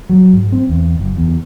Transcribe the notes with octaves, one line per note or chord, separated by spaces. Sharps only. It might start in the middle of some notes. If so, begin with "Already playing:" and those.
F#3
G#2
C4
E2
F#1
E2